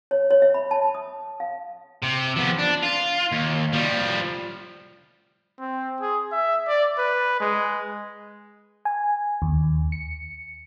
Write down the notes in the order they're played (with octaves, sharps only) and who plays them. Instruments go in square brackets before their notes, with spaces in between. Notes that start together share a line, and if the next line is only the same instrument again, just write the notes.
[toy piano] C#5
C#5
E5
B5
A5
D#6
F5
[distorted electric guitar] C3
F3 B3
D4
F4
D#2
F3 G3
[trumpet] C4
G#4
E5
D5
B4
G#3
[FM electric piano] G#5
D#2
C#7